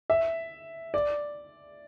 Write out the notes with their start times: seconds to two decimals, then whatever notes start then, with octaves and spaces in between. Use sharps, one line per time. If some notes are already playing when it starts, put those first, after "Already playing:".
0.10 E5
0.94 D5